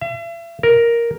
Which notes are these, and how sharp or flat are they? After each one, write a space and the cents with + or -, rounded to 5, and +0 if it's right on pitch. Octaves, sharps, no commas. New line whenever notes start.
E5 +40
A#4 +5